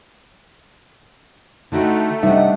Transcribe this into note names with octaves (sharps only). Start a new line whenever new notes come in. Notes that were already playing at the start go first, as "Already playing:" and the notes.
D3 A3 D#4 F#4 G5
C3 G3 D4 D#4 E5 F#5